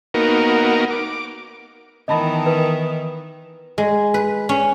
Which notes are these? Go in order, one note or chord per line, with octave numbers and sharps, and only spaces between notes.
A#3 B3 D#4 F#4 A#4
D6
D#3 E3 B3 D#5 A5 B5
B4
G#3
B4
C#4